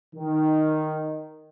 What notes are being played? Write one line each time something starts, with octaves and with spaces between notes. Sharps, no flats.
D#3